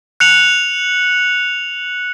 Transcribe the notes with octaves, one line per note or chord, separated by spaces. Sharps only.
F#6 C#7 F7 F#7